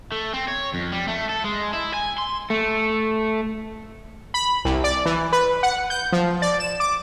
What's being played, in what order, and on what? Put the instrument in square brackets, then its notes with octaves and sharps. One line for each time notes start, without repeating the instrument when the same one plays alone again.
[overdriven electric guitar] A3
C4
C#5
F2
G3
A3
A4
G#3
E4
G#5
C6
[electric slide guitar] A3
[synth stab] B5
C2
D5
E3
B4
F#5
G6
F3
D5
E7
D6